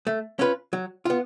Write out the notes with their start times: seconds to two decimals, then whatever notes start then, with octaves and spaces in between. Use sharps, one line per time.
0.07 A3
0.39 C#4 F4 B4
0.73 F#3
1.05 B3 F4